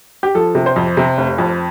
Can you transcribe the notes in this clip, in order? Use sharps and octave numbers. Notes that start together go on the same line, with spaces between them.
G4
F3 A4
C3
C5
F2
C3
F1
F2